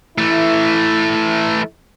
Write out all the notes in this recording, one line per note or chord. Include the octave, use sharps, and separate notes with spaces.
E3 A3 E4